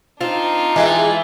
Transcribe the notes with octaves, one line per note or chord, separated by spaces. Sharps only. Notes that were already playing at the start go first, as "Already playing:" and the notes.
C4 D4 D#4 F4
E3 G#3 G4 G#4